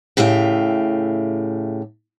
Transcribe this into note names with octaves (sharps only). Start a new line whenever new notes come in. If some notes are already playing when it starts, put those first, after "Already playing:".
A2 C#3 G4 E5 F5